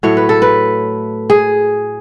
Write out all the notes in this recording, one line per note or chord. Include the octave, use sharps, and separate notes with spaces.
A2 F#3 A3 C#5
B4
A4
B4
G#4